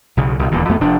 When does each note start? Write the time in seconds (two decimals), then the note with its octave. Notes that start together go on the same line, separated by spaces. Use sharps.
0.17 B1 C#3
0.39 C2 B2
0.51 D#1 E2 A#2 D3
0.69 F2 A3 B3
0.80 F1 F3 D4